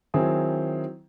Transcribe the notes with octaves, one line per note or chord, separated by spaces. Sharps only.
D#3 F#3 C4 E4 G#4